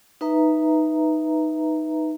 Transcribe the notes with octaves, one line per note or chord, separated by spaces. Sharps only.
D#4 B4 E5 A#5